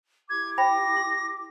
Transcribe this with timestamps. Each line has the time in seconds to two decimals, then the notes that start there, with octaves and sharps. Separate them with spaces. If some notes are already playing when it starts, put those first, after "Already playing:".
0.30 E4 G4 D6 G#6
0.58 C5 G5 B5 A#6
0.96 C6